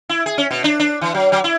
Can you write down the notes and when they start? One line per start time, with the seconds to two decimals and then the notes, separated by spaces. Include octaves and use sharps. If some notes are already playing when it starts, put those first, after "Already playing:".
0.09 E4
0.26 G#4
0.38 C#4
0.51 B2
0.64 D4
0.79 D4
1.01 E3
1.14 F#3
1.32 F#3
1.44 E4